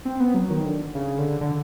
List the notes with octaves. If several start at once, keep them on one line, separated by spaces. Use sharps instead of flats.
C4
B3
F#3
D#3
D3
C#3
D3
D3